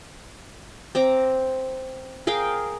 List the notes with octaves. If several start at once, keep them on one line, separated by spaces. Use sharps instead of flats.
C4 A#5 D6
G#4 A#4 F5 G5